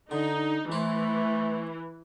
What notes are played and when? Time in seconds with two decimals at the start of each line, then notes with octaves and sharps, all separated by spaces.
0.11 D3 D#4
0.72 E3 A3 B4 C5